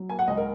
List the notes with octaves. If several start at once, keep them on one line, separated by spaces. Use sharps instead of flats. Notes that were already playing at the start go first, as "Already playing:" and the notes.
Already playing: F#3
A#3 G#5
F#5
C#2 D#5
A#4